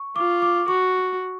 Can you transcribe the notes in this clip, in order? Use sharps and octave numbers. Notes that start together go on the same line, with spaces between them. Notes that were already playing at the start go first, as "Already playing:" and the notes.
Already playing: C#6
F4 D6
D6
F#4 C#6